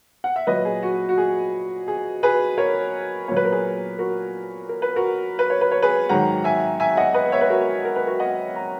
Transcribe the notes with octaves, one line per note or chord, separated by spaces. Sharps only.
F#5
E5
A#2 F#3 B4 D#5
G#4
F#4
F#4
G#4
G#4
G#4 B4
A#4 C#5
A#2 F#3 B4 C#5
A#4
G#4 B4
F#4 A#4
A#4
B4
F#4 A#4
B4
C#5
B4
C#5
G#4 B4
G#2 D#3 F#3 F#5 A#5
E5 G#5
E5 G#5
D#5 F#5
B4 D#5
C#5 E5
B4
F#4 A#4
A#4
B4
F#4 A#4
D#5 F#5
A#5